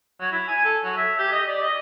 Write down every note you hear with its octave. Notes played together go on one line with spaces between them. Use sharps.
F#3
E4
G#5
A4
F#3
E5
G4
D#5
D5
D#5